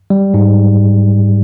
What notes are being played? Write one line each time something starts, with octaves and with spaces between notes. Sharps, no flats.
G3
G#2